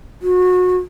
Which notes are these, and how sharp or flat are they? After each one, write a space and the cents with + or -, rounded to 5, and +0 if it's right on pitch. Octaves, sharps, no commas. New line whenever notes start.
F#4 -25